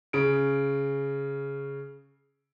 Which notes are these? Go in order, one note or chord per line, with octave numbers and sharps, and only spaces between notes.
C#3 D7